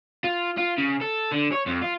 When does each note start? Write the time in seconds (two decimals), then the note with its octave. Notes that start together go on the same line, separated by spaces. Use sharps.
0.24 F4
0.58 F4
0.78 C#3
1.01 A4
1.32 D3
1.53 C#5
1.67 F2
1.82 F4